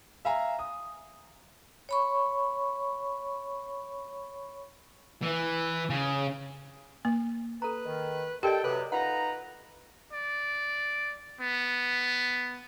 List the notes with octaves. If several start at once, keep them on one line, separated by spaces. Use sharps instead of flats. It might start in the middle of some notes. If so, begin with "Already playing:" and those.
E5 F5 G#5 A#5
D#6
C#5 B5 C#6
E3
C#3
A#3
A4 B4 A#5
D#3
G4 A4 A#4 D5 D#5 G5
F#2 C3 A4 B4
D#4 F4 B4 F5 F#5 A#5
D5
B3